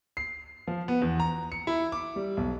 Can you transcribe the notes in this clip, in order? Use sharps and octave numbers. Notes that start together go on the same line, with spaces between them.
C7
F3
B3
E2
A#5
C#7
E4
D6
G3
B1